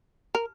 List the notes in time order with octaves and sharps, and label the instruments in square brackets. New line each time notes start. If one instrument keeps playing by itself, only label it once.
[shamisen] A#4